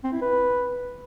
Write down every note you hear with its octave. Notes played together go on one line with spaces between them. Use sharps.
C4
E4
B4